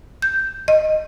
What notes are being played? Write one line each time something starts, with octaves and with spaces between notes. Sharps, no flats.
G6
D#5